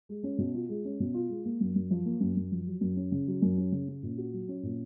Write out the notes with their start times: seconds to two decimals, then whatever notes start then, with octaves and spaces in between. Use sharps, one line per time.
0.09 G#3
0.23 C#4
0.38 B2
0.54 F4
0.69 G#3
0.85 C#4
1.00 B2
1.14 F4
1.29 G#3
1.45 A#3
1.61 F#2
1.75 F#2
1.90 F3
2.06 A#3
2.21 F#2
2.37 F#2
2.52 F3
2.66 F#3
2.81 F#2
2.96 C#4
3.12 C#3
3.27 F#3
3.42 F#2
3.57 C#4
3.72 C#3
3.88 C#4
4.03 A#2
4.18 F#4
4.33 F#3
4.48 C#4
4.63 A#2